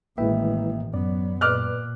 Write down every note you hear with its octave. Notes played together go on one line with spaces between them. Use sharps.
A1 D#3 G#3 A#3 E4 B4 E5 G5
F#2 F#3 B3 D5
A#2 B4 D5 D6 F6 F#6